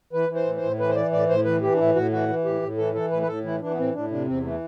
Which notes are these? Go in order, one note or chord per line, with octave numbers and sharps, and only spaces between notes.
E3 B4
E3
C5
A2
C5
A2
E3 B4
C5
E3 D5
A2 D5
A2 C5
E3 B4
E3 G4
D4
A2 E4
A2 F#4
E3 F#4
E3
A2 G4
A2
E3 A4
E3 A4
A2 B4
B4
A2 A4
E3 E4
E3 D4
B3
A2 C4
A2 D4
C3 D4
E2 C4
E3 A3